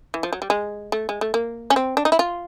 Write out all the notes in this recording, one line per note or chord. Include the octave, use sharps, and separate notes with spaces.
E3
F3
F#3
G3
G#3
A3
G#3
A3
A#3
C#4
C4
D4
D#4
E4
F4